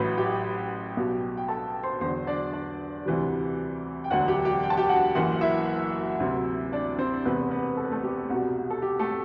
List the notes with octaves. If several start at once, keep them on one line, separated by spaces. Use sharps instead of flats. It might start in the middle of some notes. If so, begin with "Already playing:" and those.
Already playing: A1 A2 F#3 B4 B5
G4 G5
B1 B2 G3
G5
A4 A5
C5 C6
E2 D3 F#3 C5 C6
D4 D5
D4 D5
D2 C3 E3 G3
G5
E1 D2 D3 F#3 F#4 F#5
G4 G5
G4 G5
G5
A5
G4 G5
F#4 F#5
F#1 F#2 E3 F#4 F#5
E4 E5
D2 C3 F#3
D4 D5
C4 C5
E1 E2 C3 B3 B4
B3 B4
A4
B4
A3 A4
G4
C2 B2 G3 F#4
A4
G4
A3 A4